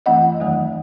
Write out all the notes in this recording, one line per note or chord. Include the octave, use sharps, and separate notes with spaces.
F#2 E3 A3 C4 D#5 F#5
E2 D#3 F#3 A3